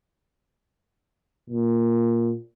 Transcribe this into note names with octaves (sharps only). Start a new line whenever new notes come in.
A#2